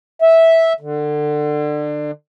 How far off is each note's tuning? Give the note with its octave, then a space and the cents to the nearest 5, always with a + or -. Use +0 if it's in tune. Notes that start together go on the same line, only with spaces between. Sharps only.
E5 -10
D3 +25